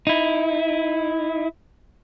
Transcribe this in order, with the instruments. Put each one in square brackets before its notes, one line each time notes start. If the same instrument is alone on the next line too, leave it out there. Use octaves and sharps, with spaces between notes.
[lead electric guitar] D#4 E4